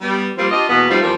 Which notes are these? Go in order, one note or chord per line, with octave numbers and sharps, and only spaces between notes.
G3 B3
F3 G3 A#3 C4 F4 C5
D4 F4 G4 D#5
E2 B2 A#3 B3
F3 G3 A3 C4 D#4 F4
E2 F3 G3 C4 A#4